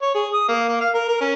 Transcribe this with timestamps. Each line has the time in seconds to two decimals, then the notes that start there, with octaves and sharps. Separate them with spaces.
0.02 C#5
0.15 G#4
0.34 D#6
0.48 A#3
0.68 A#3
0.81 F5
0.94 A#4
1.08 A#4
1.21 C#4